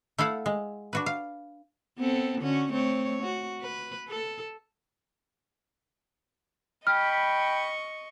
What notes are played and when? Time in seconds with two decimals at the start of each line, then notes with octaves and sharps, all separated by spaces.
0.18 A3 E4 A4 F5 F#5
0.46 G#3
0.93 D4 F#4 B4
1.06 F5
1.98 B3 C4 A4
2.41 D3 C#4 F#4
2.72 A3 C4 C#5
3.23 F#4
3.61 B4
4.09 A4
6.87 D#5 G5 B5 C#6 F6